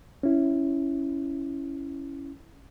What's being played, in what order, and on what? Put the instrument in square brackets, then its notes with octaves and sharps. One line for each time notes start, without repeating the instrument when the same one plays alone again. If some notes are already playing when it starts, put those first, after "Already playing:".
[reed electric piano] C#4 E4